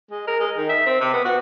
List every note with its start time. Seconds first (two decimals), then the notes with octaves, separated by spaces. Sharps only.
0.11 G#3
0.27 A#4
0.40 G#3
0.57 D#3
0.69 E5
0.86 C4
1.01 C3
1.13 B3
1.25 F#4